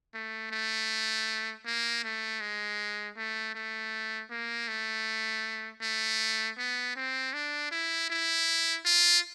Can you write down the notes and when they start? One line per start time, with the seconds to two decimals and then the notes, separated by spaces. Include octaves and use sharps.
0.15 A3
0.51 A3
1.66 A#3
2.04 A3
2.41 G#3
3.17 A3
3.55 A3
4.31 A#3
4.68 A3
5.82 A3
6.58 B3
6.96 C4
7.34 D4
7.71 E4
8.10 E4
8.85 F4